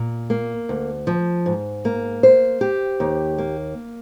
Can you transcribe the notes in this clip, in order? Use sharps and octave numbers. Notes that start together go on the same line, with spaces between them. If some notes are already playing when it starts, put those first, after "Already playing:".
Already playing: A#2
A#3
D2
F3
G#2
A#3
C5
G4
D#2
A#3